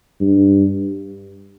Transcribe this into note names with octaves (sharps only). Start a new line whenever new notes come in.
G2